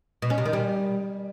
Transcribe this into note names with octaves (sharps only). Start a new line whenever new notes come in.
B2
C#4
C3
D#3
G3